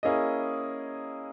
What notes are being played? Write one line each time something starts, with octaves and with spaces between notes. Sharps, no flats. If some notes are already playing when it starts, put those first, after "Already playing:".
A#3 C#4 E4 G#4 D#5